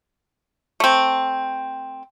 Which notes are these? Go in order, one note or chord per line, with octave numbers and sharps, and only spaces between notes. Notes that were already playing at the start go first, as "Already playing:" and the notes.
A3 C4